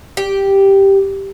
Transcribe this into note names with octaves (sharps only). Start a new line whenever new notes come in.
G4